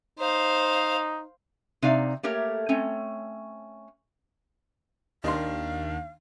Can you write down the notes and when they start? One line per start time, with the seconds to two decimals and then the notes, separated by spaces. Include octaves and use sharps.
0.19 D#4 C5 F5
1.82 C3 D#4 D5 F5
2.23 A3 A#3 G4 A#4 C#5
2.69 A3 C4 C#4
5.24 D#2 D#3 D4 D#5 F5 C6